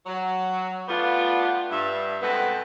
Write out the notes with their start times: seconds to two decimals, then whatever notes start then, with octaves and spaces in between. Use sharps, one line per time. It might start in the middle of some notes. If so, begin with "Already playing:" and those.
0.06 F#3
0.88 G3 A3 B3 D4 F4
1.71 G2 E5
2.22 B2 G#3 B3 C4 A4 B4